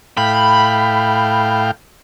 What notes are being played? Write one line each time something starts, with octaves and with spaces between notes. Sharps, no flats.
A2 F5 G5 B5